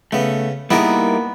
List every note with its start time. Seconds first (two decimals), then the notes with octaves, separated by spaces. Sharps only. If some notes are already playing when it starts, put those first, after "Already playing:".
0.12 C#3 A3 B3
0.70 G3 A#3 B3 D#4 E4 G#4 A#4 D5